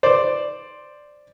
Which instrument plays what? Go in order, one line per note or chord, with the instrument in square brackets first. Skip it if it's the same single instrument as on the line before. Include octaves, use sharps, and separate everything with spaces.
[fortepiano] C5 D5